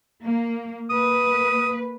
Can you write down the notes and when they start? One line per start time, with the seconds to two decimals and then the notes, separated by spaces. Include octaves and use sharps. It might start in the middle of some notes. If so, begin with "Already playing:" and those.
0.24 A#3
0.90 A#3 B4 D#6